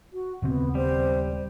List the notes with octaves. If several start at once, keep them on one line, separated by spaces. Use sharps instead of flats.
F#4
D#1 C#3 B3 C4
G3 C5